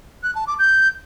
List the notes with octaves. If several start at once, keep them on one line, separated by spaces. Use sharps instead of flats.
F#6
A5
D6
G6